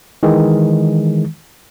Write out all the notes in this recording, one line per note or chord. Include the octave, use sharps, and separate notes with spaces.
D#3 E3 G#3